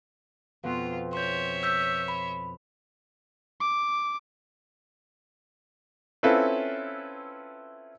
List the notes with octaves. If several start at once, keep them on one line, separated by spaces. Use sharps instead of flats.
F2 B2 F3 F4
C#5 E5 C6 G6
E6 G6 B6
B5
D6
C4 C#4 E4 F4 A4 B4